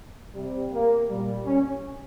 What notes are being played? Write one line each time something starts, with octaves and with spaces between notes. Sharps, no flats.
C3 G3
A#3
A#2 G3
C#4